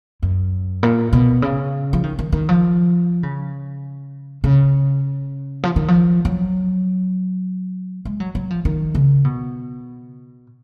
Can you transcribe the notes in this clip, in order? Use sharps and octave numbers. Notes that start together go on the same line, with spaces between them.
F#2
A#2
B2
C#3
F3
D#3
D#3
D#3
F3
C#3
C#3
F3
D#3
F3
F#3
G#3
F#3
F#3
F3
D#3
C#3
B2